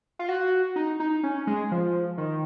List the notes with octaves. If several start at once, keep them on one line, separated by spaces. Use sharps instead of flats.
F4
F#4
D#4
D#4
C#4
G#3
F3
D#3